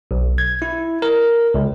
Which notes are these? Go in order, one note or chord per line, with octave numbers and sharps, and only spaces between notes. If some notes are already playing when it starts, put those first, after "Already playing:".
B1
G#6
E4
A#4
C#2